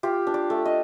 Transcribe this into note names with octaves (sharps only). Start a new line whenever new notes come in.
F4 G4
D4
D5
A3
D#5